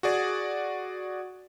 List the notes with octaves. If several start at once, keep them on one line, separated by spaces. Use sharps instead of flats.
F#4 G#4 D5